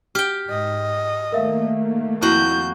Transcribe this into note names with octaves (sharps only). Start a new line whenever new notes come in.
G4 G5 F6
G#2 D#5
D#3 A3 A#3 A#4 E5 F5
F2 E4 F#4 G6